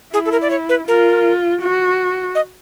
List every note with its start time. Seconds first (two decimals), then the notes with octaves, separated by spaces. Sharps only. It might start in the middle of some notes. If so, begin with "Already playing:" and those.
0.13 E4 G#4
0.26 A4
0.32 A#4
0.42 D5
0.50 C#5
0.69 B4
0.87 F4 A#4
1.61 F#4
2.35 D#5